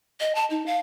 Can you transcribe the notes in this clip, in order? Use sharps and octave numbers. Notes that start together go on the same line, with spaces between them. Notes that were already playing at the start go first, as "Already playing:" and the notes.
D#5
A5
D#4
F5